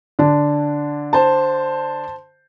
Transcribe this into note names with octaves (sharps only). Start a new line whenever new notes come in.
D3 D4
C5 A5